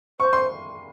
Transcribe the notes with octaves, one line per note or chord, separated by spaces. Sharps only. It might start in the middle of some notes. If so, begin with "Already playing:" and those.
C5 C#6
C6